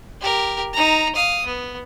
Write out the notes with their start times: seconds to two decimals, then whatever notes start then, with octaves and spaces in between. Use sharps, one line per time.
0.22 G4 A#4
0.73 D#4 A#5
1.15 F5 D#6
1.46 B3